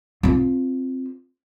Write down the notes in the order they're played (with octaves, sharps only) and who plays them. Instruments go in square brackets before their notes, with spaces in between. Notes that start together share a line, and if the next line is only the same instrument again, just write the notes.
[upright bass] C4 F4